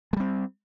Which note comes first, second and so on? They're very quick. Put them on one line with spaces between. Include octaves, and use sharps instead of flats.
G#3 G3 C4